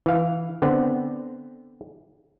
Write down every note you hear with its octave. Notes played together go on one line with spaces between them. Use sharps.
E3 F5
D3 B3 C4